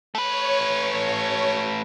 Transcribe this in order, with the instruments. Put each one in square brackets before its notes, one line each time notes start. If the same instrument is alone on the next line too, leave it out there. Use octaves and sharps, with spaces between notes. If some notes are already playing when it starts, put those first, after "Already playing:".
[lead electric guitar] A3 B4 [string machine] C#5